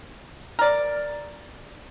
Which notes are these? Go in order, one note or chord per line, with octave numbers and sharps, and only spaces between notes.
A#4 D5